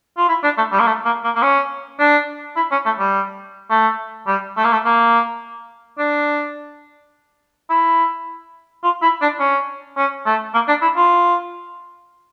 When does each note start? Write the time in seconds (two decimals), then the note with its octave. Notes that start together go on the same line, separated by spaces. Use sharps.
0.17 F4
0.29 E4
0.44 D4
0.58 A3
0.72 G3
0.80 A#3
0.86 A3
1.05 A#3
1.24 A#3
1.36 A#3
1.43 C#4
2.00 D4
2.56 E4
2.72 C#4
2.86 A3
2.99 G3
3.70 A3
4.27 G3
4.57 A3
4.64 A#3
4.72 A3
4.85 A#3
5.98 D4
7.70 E4
8.84 F4
9.02 E4
9.22 D4
9.40 C#4
9.97 C#4
10.26 A3
10.54 A#3
10.68 D4
10.82 E4
10.97 F4